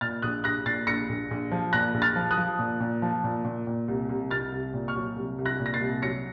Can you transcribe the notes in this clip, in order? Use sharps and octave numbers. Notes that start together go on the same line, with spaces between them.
A#2 F6 A6
A#1 D#6 F#6
A#1 F#6 A#6
A#2 A6 C7
A#1 A#6 C#7
A#1
A#1
F3
A#2 F#6 A#6
A#1
F6 A6
F3
D#6 F#6
F3
A#2
A#2
F3
A#2
A#2
A#2
C2
C2
C2 F6 A6
C2
A#2
C#6 F6
F#3
C2
C2
F#6 A#6
A#2
A#6
A6 C7
C2
F#3 A#6 C#7